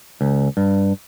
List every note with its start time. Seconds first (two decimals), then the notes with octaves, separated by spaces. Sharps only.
0.21 C#2
0.57 G2